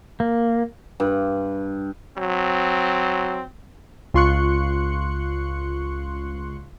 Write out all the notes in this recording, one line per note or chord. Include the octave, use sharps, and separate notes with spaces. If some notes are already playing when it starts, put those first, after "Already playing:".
A#3
G2
F#3 C4
C#2 F4 C6 C#6 F#6 C#7